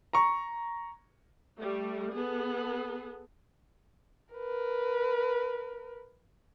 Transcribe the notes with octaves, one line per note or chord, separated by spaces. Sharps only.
A#5 C#6
G3 A3
B3 G#4 A4
A#4 B4